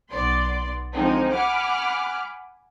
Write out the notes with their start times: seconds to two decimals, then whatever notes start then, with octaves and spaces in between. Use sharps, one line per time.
0.10 B1 B3 D5 C6
0.94 D3 F3 G#3 C4 D#4
1.32 F#5 G#5 B5 D6 F6